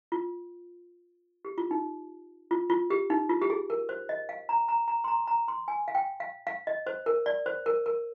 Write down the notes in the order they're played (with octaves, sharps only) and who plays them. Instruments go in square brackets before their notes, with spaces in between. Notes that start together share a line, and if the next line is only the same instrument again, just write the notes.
[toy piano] F4
G4
F4
D#4
F4
F4
G4
D#4
F4
G4
G#4
A#4
C5
D#5
F5
A#5
A#5
A#5
C6
A#5
A#5
C6
G#5
F5
G5
F5
F5
D#5
C5
A#4
D5
C5
A#4
A#4